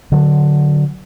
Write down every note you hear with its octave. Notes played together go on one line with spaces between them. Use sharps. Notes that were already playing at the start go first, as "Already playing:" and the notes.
D3 F#3